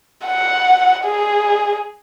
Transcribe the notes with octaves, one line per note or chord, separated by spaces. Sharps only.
F#5
G#4